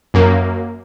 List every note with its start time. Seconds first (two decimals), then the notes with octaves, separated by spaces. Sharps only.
0.14 F#2 A#3